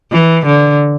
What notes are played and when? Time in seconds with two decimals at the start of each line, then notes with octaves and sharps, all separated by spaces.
0.12 E3
0.45 D3